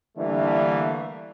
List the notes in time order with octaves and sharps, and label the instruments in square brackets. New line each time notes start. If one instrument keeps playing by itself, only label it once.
[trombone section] D3 E3 G3 A3 A#3 D4